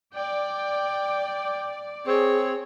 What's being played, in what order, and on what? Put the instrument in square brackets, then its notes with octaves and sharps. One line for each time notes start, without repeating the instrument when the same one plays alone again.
[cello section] D5 [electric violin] G5
[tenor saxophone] C4 [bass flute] G#4 [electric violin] C#5